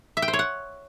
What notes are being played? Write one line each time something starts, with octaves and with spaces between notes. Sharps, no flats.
E5
G5
C5
C#5
F#5